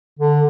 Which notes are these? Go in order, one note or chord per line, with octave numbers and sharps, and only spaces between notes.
D3